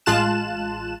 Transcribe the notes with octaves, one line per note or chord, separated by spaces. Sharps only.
A1 G#3 F4 A5 F#6 E7